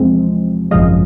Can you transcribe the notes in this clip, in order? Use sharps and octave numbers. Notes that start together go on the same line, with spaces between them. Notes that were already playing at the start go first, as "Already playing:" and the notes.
Already playing: E2 C3 F3 G#3 C4
G#1 F#2 C#3 F3 G#3 D#5 F5